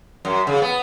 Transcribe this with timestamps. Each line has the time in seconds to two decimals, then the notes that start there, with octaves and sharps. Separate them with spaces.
0.25 F#2
0.47 C#3
0.62 B3